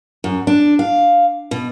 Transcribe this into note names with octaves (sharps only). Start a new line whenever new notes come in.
F#2
D4
F5
B2